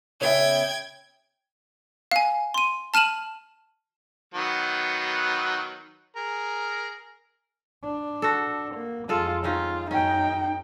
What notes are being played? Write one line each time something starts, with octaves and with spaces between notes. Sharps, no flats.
C#3 B3 E5 G5 G#6
F5 G#5
C6 D#7
A5 F6 D#7 E7 F#7
D#3 F#3 B3
G#4 A#4
D4
F#4 A4
A#3
F2 G#3 F4 A4
D#3 C#4 D#4 F4
F#2 C#4 D#4 G5